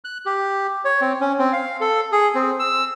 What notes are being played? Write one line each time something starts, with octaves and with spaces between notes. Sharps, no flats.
F#6
G4
C#5
C4
C#4
C4
F5
A4
G#4
C4
E6